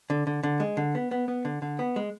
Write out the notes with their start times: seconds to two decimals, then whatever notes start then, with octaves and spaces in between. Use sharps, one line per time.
0.10 D3
0.27 D3
0.43 D3
0.60 G#3
0.77 D3
0.95 B3
1.11 B3
1.28 B3
1.45 D3
1.62 D3
1.79 B3
1.96 G#3